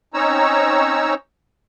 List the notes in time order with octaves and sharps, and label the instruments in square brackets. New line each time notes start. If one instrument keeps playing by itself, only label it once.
[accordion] C4 C#4 D#4 C#5 A#5 E6